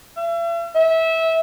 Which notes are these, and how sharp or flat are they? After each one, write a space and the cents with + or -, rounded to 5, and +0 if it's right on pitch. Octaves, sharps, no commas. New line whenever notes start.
E5 +45
E5 -20